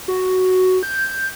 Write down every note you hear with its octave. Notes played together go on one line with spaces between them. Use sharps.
F#4
G6